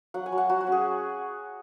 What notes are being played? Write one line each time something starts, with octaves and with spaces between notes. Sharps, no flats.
F#3 F#5
G#5
F#3
F#5
F#3 F#4
F#4
C#4
G#4